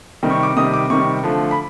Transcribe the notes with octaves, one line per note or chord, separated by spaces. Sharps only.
C3 D#3 G3
C#6
D6
C3 D#3 G3 D#6
D6
C3 D#3 G3 C#6
D3 F3 A3
B5